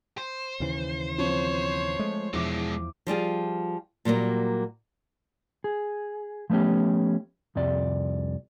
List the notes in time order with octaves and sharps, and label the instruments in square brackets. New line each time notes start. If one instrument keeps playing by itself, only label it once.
[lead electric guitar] C5
[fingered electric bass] D#2 C#3 E3
[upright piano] F3 C4 [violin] C#5
[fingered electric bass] G#3 A3
[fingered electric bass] E2 F3 [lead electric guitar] B2 G#3 [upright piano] E4 D6
[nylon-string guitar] F3 G3 F4 G#4
A#2 F#3 G3 A#3
[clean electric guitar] G#4
F3 A3 B3 C#4 G4
C2 F2 C3 D5